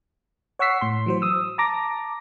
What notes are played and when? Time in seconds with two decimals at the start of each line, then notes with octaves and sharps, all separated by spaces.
0.59 C#5 F#5 C#6 E6 B6 C7
0.81 A2 C6
1.06 E3 F#3 C5
1.22 D#6 E6
1.58 A5 A#5 D6 A#6